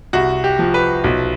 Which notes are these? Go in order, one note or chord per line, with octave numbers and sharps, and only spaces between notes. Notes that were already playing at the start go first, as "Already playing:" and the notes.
C2 F#4
G4
F3
B4
B1